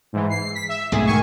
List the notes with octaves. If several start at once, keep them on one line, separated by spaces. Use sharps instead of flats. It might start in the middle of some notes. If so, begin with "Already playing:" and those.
G#2 E3
C7
B6
E5
B1 G#2 A3 G#4
D#3 G#5 C#6